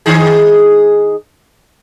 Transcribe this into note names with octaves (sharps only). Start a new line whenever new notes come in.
D#3 D#4 G#4